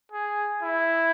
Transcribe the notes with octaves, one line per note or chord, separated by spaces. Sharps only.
G#4
E4